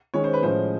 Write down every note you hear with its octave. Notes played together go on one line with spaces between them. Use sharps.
D#3 G#3 C#4 C#5
C5
B4
A2 F3 G#3 C#4 C5